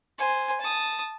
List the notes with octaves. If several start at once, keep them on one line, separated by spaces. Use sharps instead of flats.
C5 G#5
A5 D#6